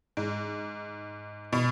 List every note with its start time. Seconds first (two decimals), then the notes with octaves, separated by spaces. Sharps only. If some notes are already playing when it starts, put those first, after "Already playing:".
0.17 G#2
1.53 B2